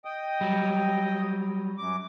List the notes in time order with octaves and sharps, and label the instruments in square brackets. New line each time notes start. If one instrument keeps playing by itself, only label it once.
[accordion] D#5 G5 D#6
[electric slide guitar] F#3 G3
[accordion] F#2 D6